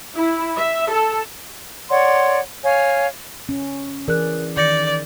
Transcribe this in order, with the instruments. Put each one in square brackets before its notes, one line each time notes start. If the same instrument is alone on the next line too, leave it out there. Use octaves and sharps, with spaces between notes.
[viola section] E4
E5
A4
[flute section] C#5 D5 F#5 C6
C#5 F5 G#5
[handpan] C#4
[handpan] E3 G#4 D5 [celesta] A#4 F#6
[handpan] D#3 [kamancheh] D5 [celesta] G6 A#6 C#7